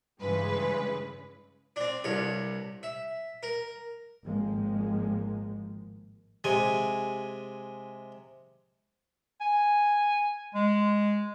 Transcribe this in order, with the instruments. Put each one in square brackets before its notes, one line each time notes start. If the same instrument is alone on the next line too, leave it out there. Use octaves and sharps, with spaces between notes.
[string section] G2 C#3 E3 G#3 B4
[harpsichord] C4 D4
C2 G2 C#5
E5
A#4
[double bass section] G#1 A2 D#3 F3 G#3 A#3
[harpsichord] C3 G#3 G#5
[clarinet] G#5
G#3